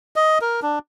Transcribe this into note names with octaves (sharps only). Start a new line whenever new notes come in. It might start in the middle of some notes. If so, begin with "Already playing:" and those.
D#5
A#4
D4